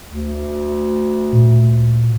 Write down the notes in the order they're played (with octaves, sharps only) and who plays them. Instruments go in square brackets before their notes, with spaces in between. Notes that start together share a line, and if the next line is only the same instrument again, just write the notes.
[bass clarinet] D2
[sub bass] A#2